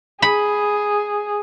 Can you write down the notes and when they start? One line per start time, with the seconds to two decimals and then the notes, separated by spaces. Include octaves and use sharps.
0.22 G#4 B5